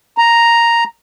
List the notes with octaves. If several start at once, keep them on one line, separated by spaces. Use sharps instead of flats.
A#5